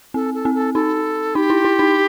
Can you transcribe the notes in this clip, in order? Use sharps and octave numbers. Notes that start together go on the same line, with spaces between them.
C4 A4
A4
C4
A4
D#4 A4
D#4 G4
E4
E4
D#4